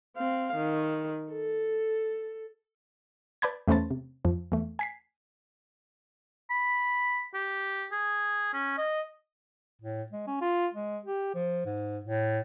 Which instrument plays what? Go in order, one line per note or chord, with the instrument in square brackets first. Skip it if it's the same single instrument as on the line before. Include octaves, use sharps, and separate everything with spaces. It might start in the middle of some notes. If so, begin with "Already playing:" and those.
[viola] C4 F5
D#3
A4
[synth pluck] B4 D5 A5 B5 G6 G#6
E2 A3 C#4 B4 C5 A5
C3
F2 F3
E2 A3
G#5 B6 C7
[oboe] B5
G4
G#4
C#4
D#5
[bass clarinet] A2
G#3
C#4
F4
G#3
G4
F3
G#2
A2